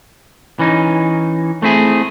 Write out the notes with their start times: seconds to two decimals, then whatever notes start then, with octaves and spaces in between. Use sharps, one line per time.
0.59 E3 C#4 D#4
1.62 A3 C4 E4 G#4